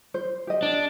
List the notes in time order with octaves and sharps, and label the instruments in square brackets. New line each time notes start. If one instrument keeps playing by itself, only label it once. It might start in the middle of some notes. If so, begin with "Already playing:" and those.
[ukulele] C5
G4 D#5
[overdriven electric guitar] D4